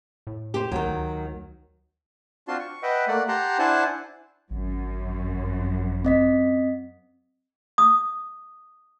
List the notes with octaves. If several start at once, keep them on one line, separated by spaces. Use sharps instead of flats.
A2
G4 C5
D2 D#3 F#3
D2
C4 D4 F4 F#4 A5 C6
C#6
B4 D#5 E5 F#5 G5
A3 A#3 D5 F#5
G4 F#5 A5 A#5 C6
D4 E4 C5 F#5 G#5 A5
G#1 F#2
C4 D#5 B6
D#6